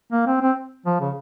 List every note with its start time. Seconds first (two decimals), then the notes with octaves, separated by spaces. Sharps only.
0.12 A#3
0.27 C4
0.42 C4
0.86 F3
1.01 C#3